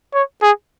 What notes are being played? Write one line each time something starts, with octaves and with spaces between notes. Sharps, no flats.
C#5
G#4